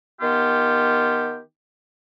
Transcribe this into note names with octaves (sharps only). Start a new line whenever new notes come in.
D#3 B3 F4 G4